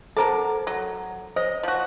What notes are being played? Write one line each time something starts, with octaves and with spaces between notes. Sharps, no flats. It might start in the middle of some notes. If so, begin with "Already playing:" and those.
F#3 A4 A#4 C5 A5 A#5
F#3
C5 C#5 D#5
F3 F#4